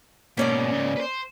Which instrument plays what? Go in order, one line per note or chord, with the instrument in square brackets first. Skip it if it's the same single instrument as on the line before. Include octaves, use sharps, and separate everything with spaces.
[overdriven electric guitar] G#2 B2 [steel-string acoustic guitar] A#3 C#4 D5
[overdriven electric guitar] G#2 C#3
B4 C5